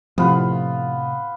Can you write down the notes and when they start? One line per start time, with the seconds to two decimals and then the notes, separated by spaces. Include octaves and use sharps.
0.18 A2 C3 F3 B3 F4 B4